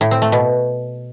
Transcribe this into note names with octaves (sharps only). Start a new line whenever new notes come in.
A2
C4
A3
B2